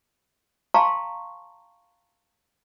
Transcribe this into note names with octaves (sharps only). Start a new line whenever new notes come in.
F5 G5 A5 A#5 C6 C#6